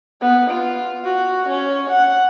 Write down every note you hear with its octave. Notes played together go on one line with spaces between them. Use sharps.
B3
F4
F#4
C#4
F#5